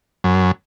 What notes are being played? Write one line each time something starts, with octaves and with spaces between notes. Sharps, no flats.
F#2